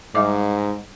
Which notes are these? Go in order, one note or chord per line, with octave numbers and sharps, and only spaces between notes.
G#2 G3 D#5 D6